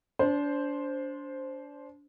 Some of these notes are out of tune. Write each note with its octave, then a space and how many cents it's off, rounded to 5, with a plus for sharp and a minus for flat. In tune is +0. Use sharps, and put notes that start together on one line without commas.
D4 -30 C5 +0